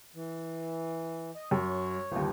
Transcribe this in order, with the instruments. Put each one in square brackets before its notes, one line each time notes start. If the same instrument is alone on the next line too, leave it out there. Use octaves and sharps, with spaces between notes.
[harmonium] E3
D#5
[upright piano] F#2 [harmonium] C#5
[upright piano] G1 D#2